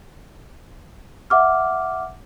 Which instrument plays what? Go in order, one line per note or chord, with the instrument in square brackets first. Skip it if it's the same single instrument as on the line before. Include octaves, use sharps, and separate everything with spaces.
[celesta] E5 F#5 D6 F6